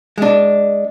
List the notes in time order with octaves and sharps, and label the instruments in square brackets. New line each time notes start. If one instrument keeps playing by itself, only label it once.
[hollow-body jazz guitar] G#3 D4